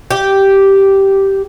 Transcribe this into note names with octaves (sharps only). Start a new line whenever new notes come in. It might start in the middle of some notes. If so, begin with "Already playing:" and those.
G4